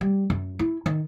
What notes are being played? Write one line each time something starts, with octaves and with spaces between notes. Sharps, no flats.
G3
F#2
E4
D#3